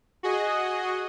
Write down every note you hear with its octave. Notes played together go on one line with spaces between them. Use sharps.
F#4 G#4 D#5